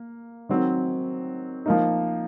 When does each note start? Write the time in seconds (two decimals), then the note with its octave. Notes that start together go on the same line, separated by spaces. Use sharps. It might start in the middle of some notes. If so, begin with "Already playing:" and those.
Already playing: A#3
0.49 D#3 F#3 C4
1.66 F3 A#3 D#4